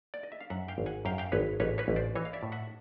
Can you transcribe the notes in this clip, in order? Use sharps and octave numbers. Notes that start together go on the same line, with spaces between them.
D5
D#5
E5
F5
F#2 E5 F#5
F5 G5
G#1
F#5 G#5
F#2 F5 G5
F5 G5
G#1 B4 C#5
A1 B4 C#5
B4 C#5
A1
C5 D5
E3 C#5 D#5
F5
D5 E5
A2
E5 F#5